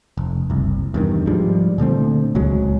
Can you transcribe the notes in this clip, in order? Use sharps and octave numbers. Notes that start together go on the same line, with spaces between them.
F1
F#1 C2
E2 G2 D#3
G#2 F3 G3 G#3
A#2 D3 A3 C4
D#1 C#2 F#3 G#3